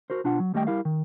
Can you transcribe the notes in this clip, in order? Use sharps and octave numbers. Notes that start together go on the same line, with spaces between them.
F#4 A#4 C5
B2 D4 F4 F#5
F#3
D#2 G3 A3 D#5 G5
G3 E4 A#4 F5
D#3